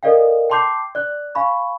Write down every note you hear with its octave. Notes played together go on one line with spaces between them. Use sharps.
A4 A#4 D5 D#5 F5 G5
G5 A5 C6 D6 G6 C7
D5 F#6
F5 G#5 B5 C#6